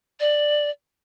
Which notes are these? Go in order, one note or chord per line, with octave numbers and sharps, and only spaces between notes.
D5